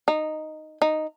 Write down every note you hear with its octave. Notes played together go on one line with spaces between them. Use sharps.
D#4
D#4